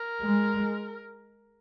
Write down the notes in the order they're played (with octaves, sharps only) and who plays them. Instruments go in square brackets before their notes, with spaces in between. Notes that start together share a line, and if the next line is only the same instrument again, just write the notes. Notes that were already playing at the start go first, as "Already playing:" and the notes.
Already playing: [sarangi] A#4
[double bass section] G#3